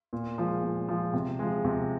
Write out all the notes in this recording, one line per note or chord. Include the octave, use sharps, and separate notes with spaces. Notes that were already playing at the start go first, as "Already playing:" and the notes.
A#2
F3 G#3
A#2
F3 G#3
C3
F3 G#3
C3